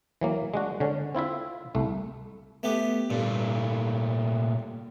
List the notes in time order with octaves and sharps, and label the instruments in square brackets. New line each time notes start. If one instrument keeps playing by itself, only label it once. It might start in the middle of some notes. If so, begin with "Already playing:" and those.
[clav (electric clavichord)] E3 F#3 A#3
G#3 D4 F#4
D3 C#4
C4 E4 F4 E5
C2 A3
[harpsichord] A3 B3 G4
[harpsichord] G2 [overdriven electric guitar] A#2 A3